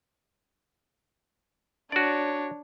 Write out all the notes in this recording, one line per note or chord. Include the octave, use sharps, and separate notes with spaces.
D4 F#4 C#5 D5